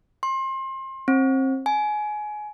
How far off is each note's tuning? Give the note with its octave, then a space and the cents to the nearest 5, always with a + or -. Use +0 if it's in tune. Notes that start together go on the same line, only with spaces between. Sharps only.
C6 +30
C4 +30
G#5 +25